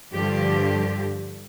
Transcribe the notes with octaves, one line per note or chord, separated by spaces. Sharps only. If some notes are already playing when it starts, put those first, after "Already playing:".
G2 D3 F3 G4